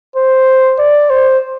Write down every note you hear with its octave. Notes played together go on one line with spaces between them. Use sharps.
C5
D5
C5